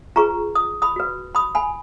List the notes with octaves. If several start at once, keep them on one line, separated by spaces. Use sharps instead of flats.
F4 G#4 B4 A#5 C#6
D#6
B5 D#6
F#4 B4
B5 D#6
G#5 B5